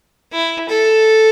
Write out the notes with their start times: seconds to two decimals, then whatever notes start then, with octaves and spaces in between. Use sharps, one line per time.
0.32 E4
0.69 A4